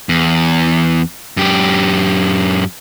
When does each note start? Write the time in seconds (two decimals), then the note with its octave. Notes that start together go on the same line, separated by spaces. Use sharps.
0.09 E2
1.37 F#2 G4